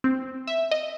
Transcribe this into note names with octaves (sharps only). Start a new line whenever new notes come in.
C4
E5
D#5